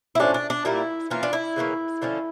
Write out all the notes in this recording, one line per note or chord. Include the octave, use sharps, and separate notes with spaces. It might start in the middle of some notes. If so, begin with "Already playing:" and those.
E4
A2 F3 C#4 D4
D4
D4
A#2 G3 A#3 E4
E3 A#3 C#4 F4
D4
E4
C#3 E3 A#3 C#4
D3 F3 A3 C#4